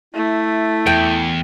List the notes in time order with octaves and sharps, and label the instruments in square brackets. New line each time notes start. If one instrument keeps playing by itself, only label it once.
[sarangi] A3 [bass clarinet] E4
[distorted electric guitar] E2 [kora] G5